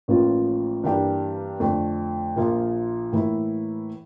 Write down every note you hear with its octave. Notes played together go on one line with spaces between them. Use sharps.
A1 A2 F3 A#3 F4
G2 E3 A#3 D4 G4
F2 D3 A3 D4
A#1 A#2 F3 A#3 F4
A2 E3 A#3 E4